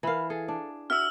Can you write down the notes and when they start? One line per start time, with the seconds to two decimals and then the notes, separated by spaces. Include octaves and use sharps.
0.03 E3 A#4 F5 B5
0.30 G#4 A4
0.48 D4
0.90 D4 F#4 E5 E6 F6